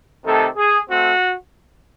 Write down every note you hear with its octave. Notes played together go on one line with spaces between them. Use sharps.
C3 D#3 A3 C4 A4
G#4
A3 C4 F#4